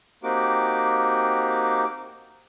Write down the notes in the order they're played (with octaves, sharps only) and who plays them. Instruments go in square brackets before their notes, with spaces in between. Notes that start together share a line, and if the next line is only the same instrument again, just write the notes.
[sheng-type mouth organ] A#3 C4 D#4 F#4 G4 D6